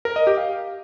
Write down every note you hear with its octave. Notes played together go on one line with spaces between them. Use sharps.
A#4
D#5
G4
F5